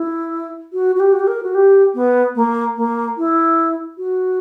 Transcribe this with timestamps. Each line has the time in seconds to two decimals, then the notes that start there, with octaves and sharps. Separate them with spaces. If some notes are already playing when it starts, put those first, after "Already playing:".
Already playing: E4
0.73 F#4
0.95 F#4
0.99 G4
1.12 F#4
1.20 G4
1.27 A#4
1.43 F#4
1.54 G4
1.94 B3
2.35 A#3
2.76 A#3
3.17 E4
3.98 F#4